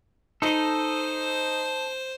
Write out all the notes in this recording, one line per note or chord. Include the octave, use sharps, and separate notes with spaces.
D#4 A4 C5 D#5